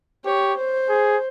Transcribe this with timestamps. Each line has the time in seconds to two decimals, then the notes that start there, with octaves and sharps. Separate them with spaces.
0.25 G4 C#5
0.57 C5
0.89 G#4